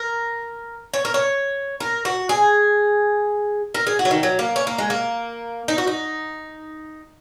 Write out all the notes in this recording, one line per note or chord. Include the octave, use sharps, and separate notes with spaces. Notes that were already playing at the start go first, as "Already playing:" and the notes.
Already playing: A#4
C#5
A#4
C#5
A#4
F#4
G#4
A#4
G#4
F#4
F#3
D#3
F#3
A#3
C#4
A#3
G#3
A#3
D#4
F#4
D#4